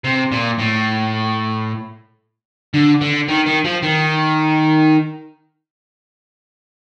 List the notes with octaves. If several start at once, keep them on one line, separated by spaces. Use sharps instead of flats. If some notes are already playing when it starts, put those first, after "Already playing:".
C3
A#2
A2
D3
D3
D#3
D#3
F3
D#3